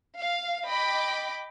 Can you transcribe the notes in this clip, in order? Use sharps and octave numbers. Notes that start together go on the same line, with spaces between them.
F5
D#5 G5 B5 D6